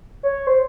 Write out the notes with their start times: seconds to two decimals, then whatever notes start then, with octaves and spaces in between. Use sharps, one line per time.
0.23 C#5
0.47 C5